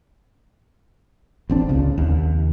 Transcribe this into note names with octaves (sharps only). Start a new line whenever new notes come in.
A1 C4 D4
C#2 C#3
D#2